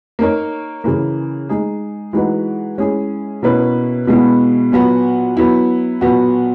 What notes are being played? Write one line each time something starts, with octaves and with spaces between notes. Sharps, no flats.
A#3 D#4 A#4 C#5
C#3 E3 A#3
G#3 D#4 G#4
E3 G#3 D#4 F#4 B4
G#3 C#4 E4 G#4
B2 A#3 C#4 E4 B4
B2 G#3 B3 E4
A#2 F#3 B3 F#4
F#3 B3 E4
A#2 F#3 B3 F#4